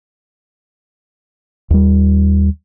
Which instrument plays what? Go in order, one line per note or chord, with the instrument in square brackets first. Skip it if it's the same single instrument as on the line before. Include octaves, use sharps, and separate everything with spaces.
[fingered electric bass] D#2 G3